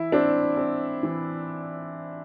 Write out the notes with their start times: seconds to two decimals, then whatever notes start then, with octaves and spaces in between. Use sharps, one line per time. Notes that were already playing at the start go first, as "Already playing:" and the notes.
Already playing: E3 E4
0.12 C4 D4
0.57 C4
1.03 E3